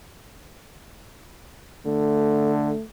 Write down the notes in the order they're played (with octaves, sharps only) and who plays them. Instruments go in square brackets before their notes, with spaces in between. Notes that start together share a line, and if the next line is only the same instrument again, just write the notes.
[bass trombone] D3 [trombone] A3